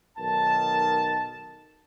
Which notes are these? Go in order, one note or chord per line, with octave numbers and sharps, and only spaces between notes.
B1 D#3 A#4 A5